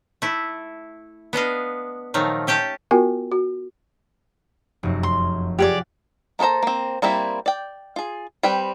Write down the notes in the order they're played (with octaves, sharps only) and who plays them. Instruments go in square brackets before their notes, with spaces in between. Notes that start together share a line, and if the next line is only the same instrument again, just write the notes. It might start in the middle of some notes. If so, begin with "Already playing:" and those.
[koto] A3 E4
B3 D4 D#5 F5
A#2 D#3 F3 F#3 A3
C#4 G4 G5 A5
[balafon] B3 F4 F#4 A#4 G#5
F#4
[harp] F1 F#2
[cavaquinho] C6
[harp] F4 F#5 [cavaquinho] G4 G#4 D5
[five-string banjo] A#3 F4 A4 C5 A#5
A#3 C4
G3 A#3 C4 E4
D5 G5
F4 G#4
G3 C4 B4 G5